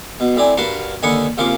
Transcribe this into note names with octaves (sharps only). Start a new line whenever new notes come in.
B2
A2 C4 D5 G#5
G2 F#4 A#4 B4 A5 C6
D#2 D3 B4 G#5 C#6 D#6
C2 C#3 F3 A#3 C6 D6